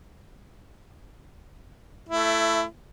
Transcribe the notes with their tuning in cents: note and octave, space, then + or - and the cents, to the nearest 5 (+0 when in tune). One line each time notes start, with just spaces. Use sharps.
A3 +0 E4 +20